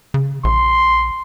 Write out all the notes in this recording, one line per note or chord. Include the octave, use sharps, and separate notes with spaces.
C#3
A#1 C6